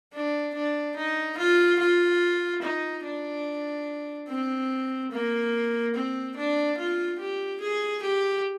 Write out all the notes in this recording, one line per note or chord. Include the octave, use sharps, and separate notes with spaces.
D4
D4
D#4
F4
F4
D#4
D4
C4
A#3
C4
D4
F4
G4
G#4
G4